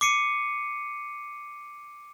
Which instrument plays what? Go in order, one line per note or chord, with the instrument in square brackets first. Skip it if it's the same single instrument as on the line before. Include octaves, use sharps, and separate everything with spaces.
[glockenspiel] D6 C7 C#7 D#7